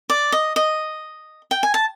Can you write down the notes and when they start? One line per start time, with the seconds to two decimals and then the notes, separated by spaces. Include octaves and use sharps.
0.10 D5
0.32 D#5
0.56 D#5
1.51 G5
1.63 G#5
1.74 A5